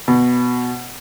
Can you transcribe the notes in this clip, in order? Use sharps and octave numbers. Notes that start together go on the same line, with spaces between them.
B2